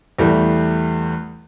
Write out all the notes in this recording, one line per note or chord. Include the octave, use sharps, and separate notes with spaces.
E2 G3 A3